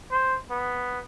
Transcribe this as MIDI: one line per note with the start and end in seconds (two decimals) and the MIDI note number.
0.11 0.37 72
0.51 1.00 59